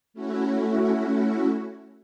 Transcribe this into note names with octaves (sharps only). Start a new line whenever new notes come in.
A3 C#4 E4 F#4